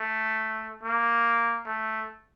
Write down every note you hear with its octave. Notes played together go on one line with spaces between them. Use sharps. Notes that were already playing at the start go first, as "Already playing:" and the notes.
Already playing: A3
A#3
A3